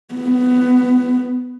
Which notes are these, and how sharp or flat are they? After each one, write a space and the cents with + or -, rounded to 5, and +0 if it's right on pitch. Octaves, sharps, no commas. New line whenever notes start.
B3 +15